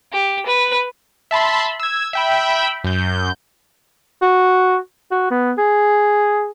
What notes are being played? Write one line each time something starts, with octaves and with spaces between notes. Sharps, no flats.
G4
B4
E5 A5 B5 C6
E6 G#6
E5 G5 B5
F#2 G6
F#4
F#4
B3
G#4